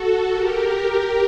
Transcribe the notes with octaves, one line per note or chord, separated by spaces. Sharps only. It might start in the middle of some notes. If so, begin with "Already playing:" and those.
Already playing: F#4 A4
G4 A#4